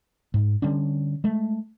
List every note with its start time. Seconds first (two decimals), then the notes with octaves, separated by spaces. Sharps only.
0.34 G#2
0.62 D3 G3 C#4 D4
1.24 G#3 A3